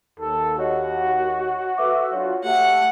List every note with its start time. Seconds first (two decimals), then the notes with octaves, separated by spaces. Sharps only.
0.20 D#2 A4
0.59 F#4 C#5 D#5 F#5
1.78 A4 B4 E5 D6
2.13 F#3 D4 F4 C#5
2.44 A3 G4 F#5